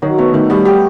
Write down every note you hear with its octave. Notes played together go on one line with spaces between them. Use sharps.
D#3 F#3
A3 B3
D#3 A3
G3 B3
G4